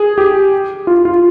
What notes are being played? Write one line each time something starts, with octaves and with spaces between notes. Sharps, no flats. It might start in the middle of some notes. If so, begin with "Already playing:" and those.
Already playing: G#4
G4
F4
F4